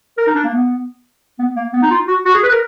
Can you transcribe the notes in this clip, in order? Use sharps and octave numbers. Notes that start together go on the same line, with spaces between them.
A#4
D#4
D4
A#3
B3
B3
A#3
B3
D#4
F4
F#4
F#4
G#4
B4
A#4